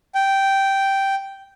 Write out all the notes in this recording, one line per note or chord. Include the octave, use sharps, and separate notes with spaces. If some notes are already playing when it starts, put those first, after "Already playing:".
G5